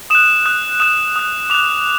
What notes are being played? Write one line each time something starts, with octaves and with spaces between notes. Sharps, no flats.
D#6 F#6 E7
D#6 F#6
D#6 F#6 E7
D#6 F#6
D6 F#6 F7